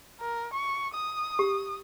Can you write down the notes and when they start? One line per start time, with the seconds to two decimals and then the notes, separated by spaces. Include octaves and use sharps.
0.20 A#4
0.53 C#6
0.94 D#6
1.39 G4